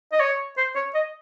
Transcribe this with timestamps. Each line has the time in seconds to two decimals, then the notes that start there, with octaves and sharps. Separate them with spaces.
0.12 D#5
0.20 C#5
0.57 C5
0.75 C#5
0.95 D#5